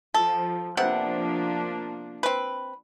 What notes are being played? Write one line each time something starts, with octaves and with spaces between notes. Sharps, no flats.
F3 A4
C3 F3 A#3 B3 D4 F#5
C4 B4